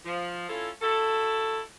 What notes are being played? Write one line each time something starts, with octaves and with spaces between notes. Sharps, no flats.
F3
C#4 E4 F4 A4
E4 F#4 A4